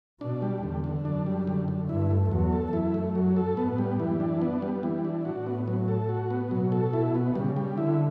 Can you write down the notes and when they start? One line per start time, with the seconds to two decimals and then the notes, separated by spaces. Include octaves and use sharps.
0.21 B2 D4
0.42 G3
0.63 E2 D3
0.84 D3
1.05 F#2 D4
1.26 G3
1.47 D3
1.68 D3
1.89 G2 E4
2.11 A3
2.31 E2 F#3
2.52 A4
2.73 F#2 E4
2.94 A3
3.15 F#3
3.36 A4
3.57 A2 B3
3.78 G3
3.99 F#2 E3
4.20 D4
4.42 B3
4.62 G3
4.83 E3
5.05 D4
5.25 A2 F#4
5.46 B3
5.68 F#3
5.88 A4
6.09 F#4
6.30 B3
6.51 B2 F#3
6.72 A4
6.93 E4
7.15 B3
7.35 C#3 G3
7.56 G3
7.77 D3 E4